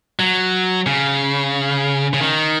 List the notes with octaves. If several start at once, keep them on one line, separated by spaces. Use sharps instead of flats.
F#3
C#3
C#3
D#3